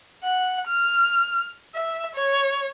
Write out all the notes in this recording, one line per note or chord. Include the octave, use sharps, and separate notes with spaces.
F#5
F6
E5
C#5